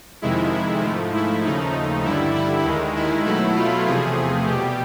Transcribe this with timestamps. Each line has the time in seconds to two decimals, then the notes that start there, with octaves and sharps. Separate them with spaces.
0.22 F2 C3 D#3 G#3 E4
0.52 E4
0.83 G#2 F3 A3
1.13 E4
1.43 D#2 C#3 F3 A3 D#4
2.04 G2 D3 G3 E4
2.35 E4
2.65 D#2 D#3 G#3
2.96 E4
3.25 B2 F#3 A3 E4
3.55 F4
3.87 E2 C3 F3 A3 G#4
4.47 B2 G3 G4